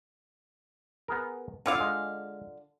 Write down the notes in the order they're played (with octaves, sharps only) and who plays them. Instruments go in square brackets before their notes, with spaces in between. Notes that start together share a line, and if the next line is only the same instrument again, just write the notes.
[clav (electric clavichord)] B3 G#4 A#4
[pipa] D3 F4 F5 [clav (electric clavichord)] C4 E4 D5
[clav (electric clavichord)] G#3